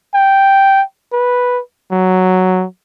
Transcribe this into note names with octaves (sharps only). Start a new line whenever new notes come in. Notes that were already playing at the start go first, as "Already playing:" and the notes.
G5
B4
F#3